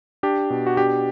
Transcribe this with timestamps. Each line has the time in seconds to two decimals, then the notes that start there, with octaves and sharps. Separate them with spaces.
0.23 D4 G4
0.50 B2
0.67 F#4
0.77 D4 G4